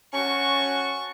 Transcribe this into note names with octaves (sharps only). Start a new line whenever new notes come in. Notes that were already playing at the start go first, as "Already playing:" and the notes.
C#4 F#4 A5 C#6